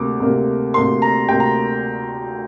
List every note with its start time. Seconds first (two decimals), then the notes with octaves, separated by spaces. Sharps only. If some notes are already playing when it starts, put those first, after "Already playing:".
Already playing: D2 C3 A#3 D6
0.20 D2 C3 A#3
0.74 D2 C3 A#3 C6
1.02 A#5
1.29 D2 C3 A#3 G5
1.40 A#5